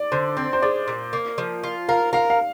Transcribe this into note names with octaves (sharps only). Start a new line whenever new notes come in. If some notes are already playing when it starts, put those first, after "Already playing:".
Already playing: D5
D3 C5
C4 C5
C5
G#3 D5
A#2
A#3
F3
F4
A#4 F5
A#4 F5
F5